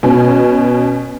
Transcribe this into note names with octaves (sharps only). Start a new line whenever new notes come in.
B2 C#4